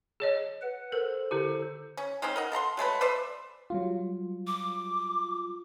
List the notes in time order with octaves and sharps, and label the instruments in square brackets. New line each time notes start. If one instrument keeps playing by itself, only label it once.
[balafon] G#4 C#5 D#5
[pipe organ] B4 F#5
[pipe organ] A4 C5 [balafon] A#4
[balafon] D3 E4 G4
[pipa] C#4
G#3 C4 C#4 D#4
A#4 D#5 F#5
A4 F#5 A#5 C6
F#3 G#3 A3 B4
B4 C5 D5 E5
[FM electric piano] F#3 G3 F4
[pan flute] D6